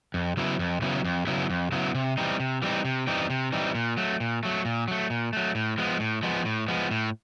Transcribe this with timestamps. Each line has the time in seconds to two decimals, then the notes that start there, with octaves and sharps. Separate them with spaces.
0.14 F2
0.37 C#3 F#3 B3 E4
0.59 F2
0.82 C#3 F#3 B3 E4
1.04 F2
1.27 C#3 F#3 B3 E4
1.50 F2
1.72 C#3 F#3 B3 E4
1.95 C3
2.17 E3 G3 C4 D#4
2.40 C3
2.62 E3 G3 C4 D#4
2.85 C3
3.07 E3 G3 C4 D#4
3.30 C3
3.52 E3 G3 C4 D#4
3.75 A#2
3.97 F#3 A3
4.20 A#2
4.43 F#3 A3
4.65 A#2
4.88 F#3 A3
5.10 A#2
5.33 F#3 A3
5.55 A2
5.78 F3 G#3 B3
6.00 A2
6.23 F3 G#3 B3
6.45 A2
6.68 F3 G#3 B3
6.91 A2